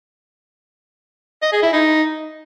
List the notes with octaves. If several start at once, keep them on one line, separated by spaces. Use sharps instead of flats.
D#5
G#4
E4
D#4